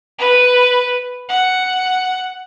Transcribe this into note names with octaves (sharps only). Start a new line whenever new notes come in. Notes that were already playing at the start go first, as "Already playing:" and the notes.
B4
F#5